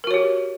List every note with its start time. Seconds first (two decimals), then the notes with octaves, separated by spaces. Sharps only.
0.04 A#4
0.07 F#4
0.11 C#5
0.14 G4